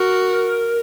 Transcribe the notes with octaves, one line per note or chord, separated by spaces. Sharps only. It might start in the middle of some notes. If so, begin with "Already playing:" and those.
Already playing: F#4 A#4